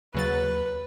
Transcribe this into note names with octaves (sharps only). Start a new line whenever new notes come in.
D#2 C#3 F#3 B4 A6